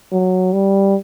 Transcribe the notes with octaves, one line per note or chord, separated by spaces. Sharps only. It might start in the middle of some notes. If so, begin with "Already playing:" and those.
F#3
G3